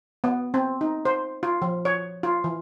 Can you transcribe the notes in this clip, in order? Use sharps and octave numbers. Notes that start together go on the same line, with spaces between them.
B3
C4
D#4
C5
F4
F3
C#5
F4
E3